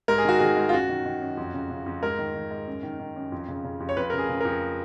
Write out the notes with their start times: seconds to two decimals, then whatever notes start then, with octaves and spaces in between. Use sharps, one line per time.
0.08 G#2 A#4
0.18 G#4
0.25 D#3 F#4
0.39 D#3 G#4
0.57 G#2
0.69 F4
0.73 F#2 F#4
0.89 D#3
1.06 D#3
1.22 F#2
1.37 F2
1.54 C#3
1.70 C#3
1.86 F2
2.03 G#2 A#4
2.19 D#3
2.35 D#3
2.51 G#2
2.67 F#2
2.83 D#3
3.00 D#3
3.16 F#2
3.32 F2
3.48 C#3
3.64 C#3
3.80 F2
3.89 C#5
3.97 F2 B4
4.10 A#4
4.13 C#3
4.18 G#4
4.29 C#3
4.40 F2 A#4